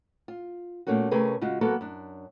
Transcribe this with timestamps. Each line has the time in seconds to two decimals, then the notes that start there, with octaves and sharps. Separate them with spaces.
0.28 F4
0.87 A#2 A3 A#3 C#4 F#4
1.11 C3 A3 C#4 G#4 A#4 B4
1.41 C#3 G#3 F4 F#4
1.61 F#3 A#3 B3 F#4 A4
1.81 F#2 D4